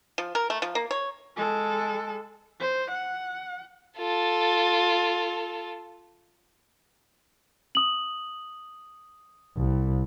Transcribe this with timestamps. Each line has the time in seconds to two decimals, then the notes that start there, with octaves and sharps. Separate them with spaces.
0.18 F3
0.35 A#4
0.50 A3
0.62 F3
0.75 A#3
0.91 C#5
1.37 G#3 A4
2.60 C5
2.90 F#5
3.98 F4 A4
7.75 D#6 F#7
9.57 C2